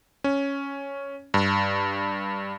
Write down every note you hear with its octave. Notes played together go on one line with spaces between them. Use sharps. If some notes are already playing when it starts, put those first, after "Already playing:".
C#4
G2